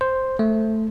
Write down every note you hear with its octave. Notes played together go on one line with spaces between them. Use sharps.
C5
A3